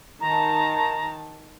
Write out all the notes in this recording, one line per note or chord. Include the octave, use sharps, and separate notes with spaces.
D#3 A5 A#5